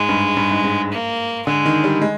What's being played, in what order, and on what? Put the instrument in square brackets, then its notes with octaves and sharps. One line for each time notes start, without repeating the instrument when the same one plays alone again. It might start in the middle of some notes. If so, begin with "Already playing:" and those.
Already playing: [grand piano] G#2 [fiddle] G#3
[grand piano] G2
G2
G#2
G#2
[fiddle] A#3
[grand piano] D3 [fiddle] G#3
[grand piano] D#3
G3
G#3